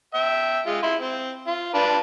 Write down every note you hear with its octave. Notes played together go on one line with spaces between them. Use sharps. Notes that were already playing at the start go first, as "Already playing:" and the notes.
E5 G5
G#3 F4
E4 C6
C4
F4
D4 F4 B4